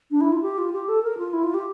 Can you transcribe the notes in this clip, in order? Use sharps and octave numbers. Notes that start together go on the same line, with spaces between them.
D4
E4
F4
G4
F4
G4
A4
A#4
F4
E4
F4
G4